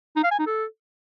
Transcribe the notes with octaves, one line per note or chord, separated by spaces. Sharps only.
D#4
F5
G#5
D#4
A4